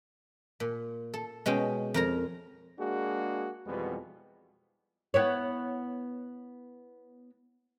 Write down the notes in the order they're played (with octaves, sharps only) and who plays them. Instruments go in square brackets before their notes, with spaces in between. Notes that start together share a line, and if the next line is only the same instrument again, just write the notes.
[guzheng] A#2
A4
B2 G#3 C#4 G5
F2 A#4 A#5
[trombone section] G#3 A#3 D4 F#4 G#4
F2 B2 E3 G3 G#3 B3
[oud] B3 E4 C#5